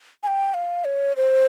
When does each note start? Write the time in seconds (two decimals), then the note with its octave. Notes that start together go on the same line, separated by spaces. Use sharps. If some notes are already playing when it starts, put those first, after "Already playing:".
0.23 G#5
0.27 G5
0.54 F5
0.85 C#5
1.17 C5